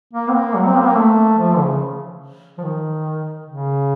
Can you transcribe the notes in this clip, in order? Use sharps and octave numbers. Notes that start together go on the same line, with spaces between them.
A#3
C4
A#3
F#3
C4
A#3
C4
A#3
A3
F3
C#3
F3
D#3
C#3